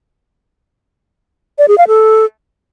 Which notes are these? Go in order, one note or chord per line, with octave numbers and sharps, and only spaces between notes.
D5
G#4
F5
A4